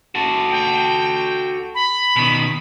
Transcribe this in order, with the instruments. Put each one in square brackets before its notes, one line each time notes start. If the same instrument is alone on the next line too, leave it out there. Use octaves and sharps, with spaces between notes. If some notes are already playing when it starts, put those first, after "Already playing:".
[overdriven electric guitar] F#4 A4
[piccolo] G5
B5
[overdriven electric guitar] B2 D#3